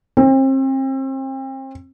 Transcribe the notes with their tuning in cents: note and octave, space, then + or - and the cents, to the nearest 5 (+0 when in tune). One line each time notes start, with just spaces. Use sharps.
C4 +35